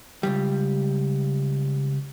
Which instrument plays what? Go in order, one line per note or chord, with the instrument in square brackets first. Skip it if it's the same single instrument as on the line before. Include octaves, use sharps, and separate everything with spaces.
[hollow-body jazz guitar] C#2 G2 G3